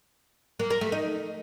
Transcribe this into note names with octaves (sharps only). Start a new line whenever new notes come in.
A#3
A#4
A3
D#4